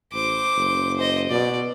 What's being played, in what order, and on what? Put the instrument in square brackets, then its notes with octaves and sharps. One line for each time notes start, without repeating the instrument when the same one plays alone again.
[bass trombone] A1 [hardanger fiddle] C5 D6
[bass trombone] F#1
[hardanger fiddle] C5 D#5
[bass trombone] B2 [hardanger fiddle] D5